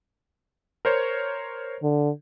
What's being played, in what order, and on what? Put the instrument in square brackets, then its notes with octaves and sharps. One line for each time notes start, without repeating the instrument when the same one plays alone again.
[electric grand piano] A#4 C5 C#5
[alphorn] D3